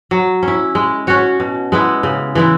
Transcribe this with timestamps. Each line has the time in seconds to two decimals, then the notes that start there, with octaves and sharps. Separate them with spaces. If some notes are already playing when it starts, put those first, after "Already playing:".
0.11 F#3
0.43 C#4
0.48 E4
0.75 G#3
1.07 C#4 F#4 C#5
1.40 B2
1.72 G#3 B3 E4
2.03 C#3
2.35 E3 G#3 E4